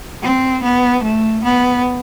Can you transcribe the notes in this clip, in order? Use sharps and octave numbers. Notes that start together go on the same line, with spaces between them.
C4
B3
A3
B3